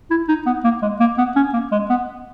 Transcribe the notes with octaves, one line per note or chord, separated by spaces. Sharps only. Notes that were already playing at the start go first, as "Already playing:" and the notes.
E4
D#4
B3
A#3
G#3
A#3
B3
C#4
A#3
G#3
B3